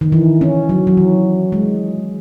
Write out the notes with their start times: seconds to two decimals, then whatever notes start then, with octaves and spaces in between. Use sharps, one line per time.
0.01 D#3
0.12 E3
0.41 C#4
0.69 F#3
0.87 F#3
0.97 E3
1.52 G#3